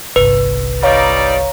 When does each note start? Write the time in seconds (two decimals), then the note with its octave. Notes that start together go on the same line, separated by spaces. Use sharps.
0.16 G1 C2 B4
0.83 G3 D#4 C#5 D5 F5 A#5